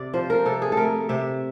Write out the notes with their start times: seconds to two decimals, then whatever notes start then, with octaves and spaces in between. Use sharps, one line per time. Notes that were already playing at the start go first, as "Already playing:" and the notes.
Already playing: C3 D5
0.14 F3 C5
0.30 A#4
0.45 C3 A4
0.62 G#4
0.72 A4
0.77 A3 A#4
1.09 C3 E5